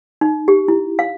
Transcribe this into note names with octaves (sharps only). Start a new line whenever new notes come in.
D#4
G4
E4
F5